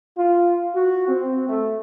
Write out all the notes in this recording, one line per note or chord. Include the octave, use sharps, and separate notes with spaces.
F4
F#4
C4
A3